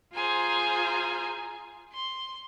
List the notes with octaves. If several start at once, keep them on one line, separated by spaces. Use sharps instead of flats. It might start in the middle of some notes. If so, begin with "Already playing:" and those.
F4 G#4 C5 G#5 A#5
C6